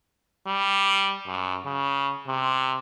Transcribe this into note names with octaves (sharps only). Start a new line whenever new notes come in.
G3
F#2
C#3
C3